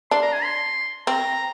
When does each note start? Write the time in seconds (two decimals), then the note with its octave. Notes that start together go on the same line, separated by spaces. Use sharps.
0.11 D4 C6
0.22 A#5
0.33 G#5
0.44 C6
1.07 C4 A#5